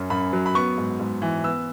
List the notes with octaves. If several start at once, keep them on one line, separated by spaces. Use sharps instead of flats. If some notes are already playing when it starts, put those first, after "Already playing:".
Already playing: F#2 C#4
F#2 B5
F#3
B5
B3 C#6
G#2
G#2
E3
B3 E6